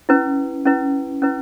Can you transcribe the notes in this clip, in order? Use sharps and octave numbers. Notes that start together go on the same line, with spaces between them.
C#4 E4 B4
C#4 E4 B4
C#4 E4 B4